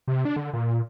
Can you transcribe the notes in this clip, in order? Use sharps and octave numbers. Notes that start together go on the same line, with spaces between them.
C3
D4
D3
A#2